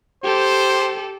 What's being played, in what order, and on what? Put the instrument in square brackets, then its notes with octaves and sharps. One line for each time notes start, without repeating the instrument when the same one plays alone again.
[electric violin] G4 A4 [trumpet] C5